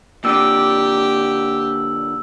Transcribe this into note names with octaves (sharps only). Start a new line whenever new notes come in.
A#2 D3 G4 E6